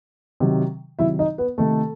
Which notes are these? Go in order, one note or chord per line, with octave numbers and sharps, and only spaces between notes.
C3 D#3 F#3
C3 D#3 F#3 E4 E5
D#4 D#5
B3 B4
C3 D#3 A3 A4